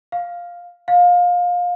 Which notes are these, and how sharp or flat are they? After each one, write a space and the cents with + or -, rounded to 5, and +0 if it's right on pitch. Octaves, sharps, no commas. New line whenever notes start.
F5 +5
F5 +25